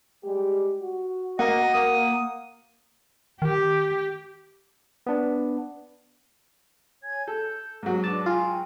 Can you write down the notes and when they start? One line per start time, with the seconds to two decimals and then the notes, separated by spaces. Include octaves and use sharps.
0.24 G3 G#3 G4
0.82 F#4
1.39 A#3 D#5 F#5
1.74 A#3 D#6
3.42 D#3 G4
5.07 B3 D4
7.03 C#5 G#5 G#6
7.28 A4 G6
7.83 G#2 F#3
8.04 D4 B4 A5 D6
8.26 F4 G5 G#5